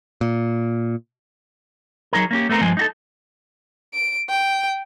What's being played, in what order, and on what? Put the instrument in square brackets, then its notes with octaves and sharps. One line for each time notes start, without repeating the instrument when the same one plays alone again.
[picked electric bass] A#2
[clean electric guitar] F#3 D#4 G#4 A#4
A#3 C#4 G4
A3 B3 C4 A#4
G2 F3 G#3 G#5
D#4 F#4 A4
[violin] D7
G5